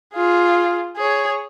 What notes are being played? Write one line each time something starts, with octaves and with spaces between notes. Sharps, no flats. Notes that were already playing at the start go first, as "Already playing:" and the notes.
F4 G#4
G#4 C#5